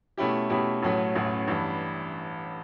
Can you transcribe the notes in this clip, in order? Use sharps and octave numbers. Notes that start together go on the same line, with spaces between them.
B2 A3 C#4 E4 G4
B2 A3 C#4 E4 G4
A1 A2 F#3 A3 C#4
A1 A2 F#3 A3 C#4
A1 G2 E3